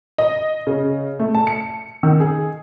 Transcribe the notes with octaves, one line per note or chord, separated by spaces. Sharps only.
D#5
C#3
A3
A5
C#7
D#3
G#4